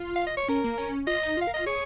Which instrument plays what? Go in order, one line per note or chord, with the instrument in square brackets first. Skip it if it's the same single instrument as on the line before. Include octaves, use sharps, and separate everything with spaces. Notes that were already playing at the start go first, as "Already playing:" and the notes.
Already playing: [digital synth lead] F4
[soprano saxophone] F5
D#5
C#5
[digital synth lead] C#4 [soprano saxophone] A#4
[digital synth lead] A#3
C#4
[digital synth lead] F4 [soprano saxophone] D#5
[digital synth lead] D#4
F4
[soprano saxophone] F5
[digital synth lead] A#4
[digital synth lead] F4 [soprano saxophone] D#5
[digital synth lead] G#4 [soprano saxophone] C#5